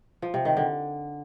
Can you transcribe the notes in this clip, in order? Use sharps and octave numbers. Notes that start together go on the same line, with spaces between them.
F3
C3
D#3
D3